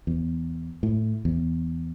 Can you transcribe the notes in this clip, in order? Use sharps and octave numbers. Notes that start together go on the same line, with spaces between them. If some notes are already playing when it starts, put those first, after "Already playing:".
E2
A2
E2